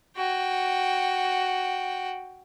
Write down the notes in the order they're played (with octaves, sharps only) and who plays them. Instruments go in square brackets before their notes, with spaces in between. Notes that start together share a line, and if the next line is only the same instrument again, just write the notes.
[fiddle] F#4 G5